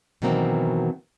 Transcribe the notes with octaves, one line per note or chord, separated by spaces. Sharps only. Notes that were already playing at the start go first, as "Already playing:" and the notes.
B2 D#3 E3 F#3 A#3 C4